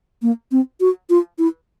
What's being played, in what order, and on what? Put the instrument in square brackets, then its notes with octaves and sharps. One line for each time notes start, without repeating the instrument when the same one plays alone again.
[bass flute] A#3
C4
F#4
F4
E4